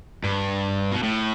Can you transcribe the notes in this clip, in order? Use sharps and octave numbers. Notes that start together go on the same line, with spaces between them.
G2
B2
A2